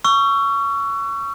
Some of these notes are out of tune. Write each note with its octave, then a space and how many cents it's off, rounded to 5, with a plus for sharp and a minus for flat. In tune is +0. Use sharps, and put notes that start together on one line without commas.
C#6 +15 E6 +40